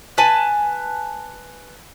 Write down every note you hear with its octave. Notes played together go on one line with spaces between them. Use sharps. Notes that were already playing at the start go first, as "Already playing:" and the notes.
B4 G#5 A5